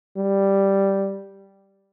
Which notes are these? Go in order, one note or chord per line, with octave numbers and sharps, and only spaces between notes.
G3